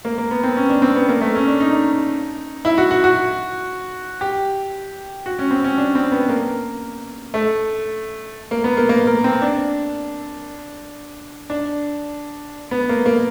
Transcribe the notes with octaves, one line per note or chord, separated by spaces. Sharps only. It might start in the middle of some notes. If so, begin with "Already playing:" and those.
A#3
A#3
B3
C4
C#4
D4
C4
B3
A#3
A3
C#4
D4
D#4
E4
F#4
F#4
F#4
G4
F#4
C#4
C4
C#4
D4
C4
B3
A#3
A3
A#3
B3
A#3
A#3
A#3
C4
D4
D4
B3
A#3
A#3